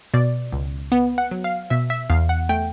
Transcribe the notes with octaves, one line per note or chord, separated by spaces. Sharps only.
B2 D5
C#2
B3
F#5
F#3
F5
B2 E5
E5
E2 F5
F#5
A3 G5